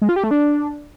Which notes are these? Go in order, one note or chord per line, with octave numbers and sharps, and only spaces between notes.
G#3
F4
G4
A3
D4